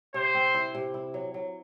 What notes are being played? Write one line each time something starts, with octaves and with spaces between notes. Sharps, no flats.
C3 C5
C4
E4
C3
E4
F#3
F#3